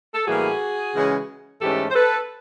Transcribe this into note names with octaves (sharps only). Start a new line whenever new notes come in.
A4
A2 E3 G3 A#3 F#4 G#4
C#3 E3 G#3 C#4
G#2 E3 A3 C#4 G4 A4
C5
A4 B4